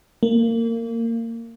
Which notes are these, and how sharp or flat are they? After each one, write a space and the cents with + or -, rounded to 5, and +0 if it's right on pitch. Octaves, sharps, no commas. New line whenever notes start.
A#3 -25